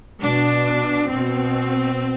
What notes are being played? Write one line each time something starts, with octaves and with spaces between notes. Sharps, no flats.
B2 D4
B2 C4